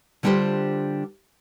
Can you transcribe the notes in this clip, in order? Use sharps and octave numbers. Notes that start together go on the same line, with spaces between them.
D3 G3 D4 F4 G4 C5